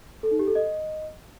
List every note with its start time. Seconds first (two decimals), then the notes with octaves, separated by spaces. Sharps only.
0.23 A4
0.31 D#4
0.39 G4
0.47 A4
0.55 D#5